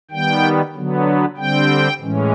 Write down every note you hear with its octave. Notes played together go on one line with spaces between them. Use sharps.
D#3 G3 B3 G5
D3 F#3 B3
D3 G3 C4 G5
A2 E3 G#3 C#4